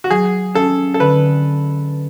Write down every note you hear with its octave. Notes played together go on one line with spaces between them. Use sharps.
F#4
F#3 G#4
C#4 A4
A4
D3 B4